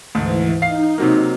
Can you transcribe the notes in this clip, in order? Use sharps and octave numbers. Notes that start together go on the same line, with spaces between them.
D2 G#2 E3
D#4 F5 C7
C3 F#3 A#3